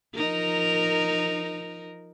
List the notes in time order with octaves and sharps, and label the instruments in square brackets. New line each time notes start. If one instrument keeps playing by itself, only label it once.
[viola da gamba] F3 D#4 A#4